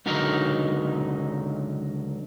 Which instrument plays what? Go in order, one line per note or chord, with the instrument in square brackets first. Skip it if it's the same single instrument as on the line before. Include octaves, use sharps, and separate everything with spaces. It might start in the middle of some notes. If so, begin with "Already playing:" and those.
[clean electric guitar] C#2 D3 F#3 D#4 A#4